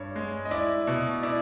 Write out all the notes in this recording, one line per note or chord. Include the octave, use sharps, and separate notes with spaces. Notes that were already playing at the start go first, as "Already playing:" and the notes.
Already playing: G2 C#5
G#3
D#5
E4 D5
B2
E4 D5